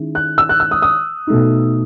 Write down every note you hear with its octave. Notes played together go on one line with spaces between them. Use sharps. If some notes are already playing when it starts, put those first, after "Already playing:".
Already playing: D#3 G#3 C#4 E4
F#6
E6
F#6
E6
D#6
D#6
B2 A3 D#4